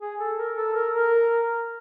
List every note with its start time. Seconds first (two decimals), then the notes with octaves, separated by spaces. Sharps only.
0.01 G#4
0.19 A4
0.37 A#4
0.56 A4
0.74 A#4
0.92 A#4